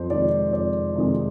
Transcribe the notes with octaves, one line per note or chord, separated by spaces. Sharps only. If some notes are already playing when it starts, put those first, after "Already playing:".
Already playing: F2 C5
C3 D#3 G#3 D5
F2 D5
C3 D#3 G#3